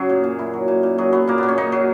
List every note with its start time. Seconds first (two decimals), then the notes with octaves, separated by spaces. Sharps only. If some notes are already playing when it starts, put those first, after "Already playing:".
Already playing: F#2 C#3 F#3 G#4
0.09 A#2
0.24 A#2
0.39 A#2 E4
0.53 F#3
0.68 A#2
0.83 A#2
0.98 F#3 G#4
1.12 F#3 B3
1.27 A#2 A#3
1.38 A#2 B3
1.48 C#4
1.58 A#2 D#4
1.72 F#3